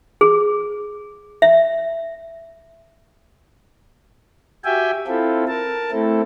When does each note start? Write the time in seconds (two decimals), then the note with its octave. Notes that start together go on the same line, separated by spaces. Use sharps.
0.21 G#4
1.42 E5
4.65 F#4 G4 E5 G5 G#5
5.07 C4 E4 F4 A4
5.48 A#4 A5
5.91 A3 C4 E4 A4